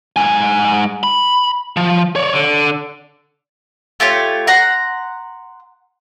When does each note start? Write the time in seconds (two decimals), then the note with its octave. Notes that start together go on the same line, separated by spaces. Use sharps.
0.16 G#2 G#5
1.03 B5
1.77 F3
2.16 C#5 D5
2.33 D3
4.00 A3 F4 G4 C#5
4.47 F#5 A#5 C6